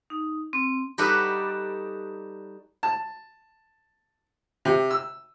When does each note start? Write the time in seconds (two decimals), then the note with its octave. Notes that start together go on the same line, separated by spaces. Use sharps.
0.10 D#4
0.53 C4
0.98 G3 D#4 F#4 A4 B4 D5
2.83 A5
4.65 C3
4.91 E6